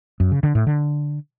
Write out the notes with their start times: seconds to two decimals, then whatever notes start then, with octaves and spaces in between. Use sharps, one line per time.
0.20 F#2
0.32 C#3
0.43 D3
0.55 A2
0.67 D3